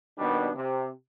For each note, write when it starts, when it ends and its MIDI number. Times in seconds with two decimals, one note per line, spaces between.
0.18 0.49 39
0.18 0.49 47
0.18 0.49 51
0.18 0.49 55
0.18 0.49 59
0.18 0.49 62
0.55 0.89 48